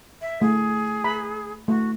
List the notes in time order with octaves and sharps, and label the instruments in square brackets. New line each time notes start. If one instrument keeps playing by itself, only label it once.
[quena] E5
[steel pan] A3 [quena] G#4
[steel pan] A#5 B5
[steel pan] A3 [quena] F#4